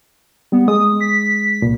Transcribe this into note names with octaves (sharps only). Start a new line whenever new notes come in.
G3 B3
G#3 D#6
B6
C2 A#2